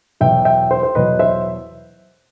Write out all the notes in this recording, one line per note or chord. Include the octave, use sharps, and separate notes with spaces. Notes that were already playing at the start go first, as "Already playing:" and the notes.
E2 B2 F#3 E5 G5
E5 G5
C5
C5
E2 B2 F#3 B4 D#5
C5 E5